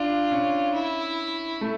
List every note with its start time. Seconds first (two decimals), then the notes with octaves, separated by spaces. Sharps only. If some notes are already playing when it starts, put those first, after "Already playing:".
Already playing: D4 F4
0.31 C#4
0.74 E4
1.61 A3